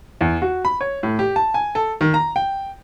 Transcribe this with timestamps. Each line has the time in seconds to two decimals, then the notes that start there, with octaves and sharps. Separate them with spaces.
0.21 E2
0.42 F#4
0.65 B5
0.81 C#5
1.03 A2
1.19 G4
1.36 A5
1.54 G#5
1.75 A4
2.01 D#3
2.14 A#5
2.36 G5